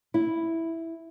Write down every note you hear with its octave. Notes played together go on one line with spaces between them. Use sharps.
E4